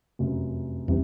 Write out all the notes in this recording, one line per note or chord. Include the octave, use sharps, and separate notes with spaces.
F1 F#2
E2 C3 G3